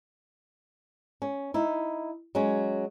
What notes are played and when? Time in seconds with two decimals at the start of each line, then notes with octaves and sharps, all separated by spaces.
1.22 C#4
1.54 D#4 E4
2.35 F#3 G#3 C#4